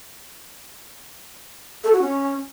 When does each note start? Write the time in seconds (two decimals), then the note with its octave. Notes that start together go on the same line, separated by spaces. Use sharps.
1.84 A4
1.93 F#4
2.01 C#4